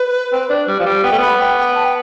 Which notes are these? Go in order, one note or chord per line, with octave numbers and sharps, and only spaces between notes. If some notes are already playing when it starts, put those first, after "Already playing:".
Already playing: B4
C4
D4
G3
F3
G3
B3 G5
A3
B3 B5
G5
G5
A5
G5